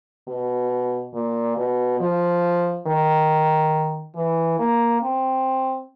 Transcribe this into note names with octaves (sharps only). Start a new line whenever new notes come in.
B2
A#2
B2
F3
D#3
E3
A#3
C4